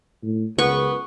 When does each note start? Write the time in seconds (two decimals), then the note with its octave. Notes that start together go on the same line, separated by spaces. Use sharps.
0.23 A2
0.59 C#2 F#2 B3 C#6